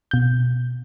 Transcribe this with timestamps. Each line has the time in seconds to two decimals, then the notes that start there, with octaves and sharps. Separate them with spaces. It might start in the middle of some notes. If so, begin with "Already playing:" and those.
0.11 B2 G6